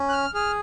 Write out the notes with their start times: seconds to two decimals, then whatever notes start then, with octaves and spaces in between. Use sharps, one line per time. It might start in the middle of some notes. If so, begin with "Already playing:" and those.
Already playing: C#4
0.09 F#6
0.13 F6
0.34 G#4 F6